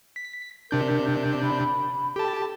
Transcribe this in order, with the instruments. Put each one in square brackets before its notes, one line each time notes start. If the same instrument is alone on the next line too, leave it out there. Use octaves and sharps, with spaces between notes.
[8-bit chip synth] B6
[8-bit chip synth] C3 D4 G6 [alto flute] A#4
[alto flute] B5
[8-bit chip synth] G4 A5 [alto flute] A4